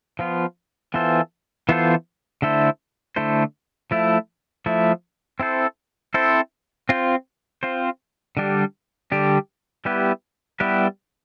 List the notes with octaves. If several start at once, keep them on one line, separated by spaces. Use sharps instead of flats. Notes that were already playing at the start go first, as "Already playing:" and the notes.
F3 B3 F4
E3 B3 F4 A4 C5
E3 B3 F4 A4 C5
D3 A3 E4 A4 C5
D3 A3 E4 A4 C5
F3 A3 E4
F3 A3 E4
C4 E4 A4 C5
C4 E4 A4 C5
C4 F4 C5
C4 F4 C5
D3 G3 D4 G4
D3 G3 D4 G4
G3 B3 E4 G4 B4
G3 B3 E4 G4 B4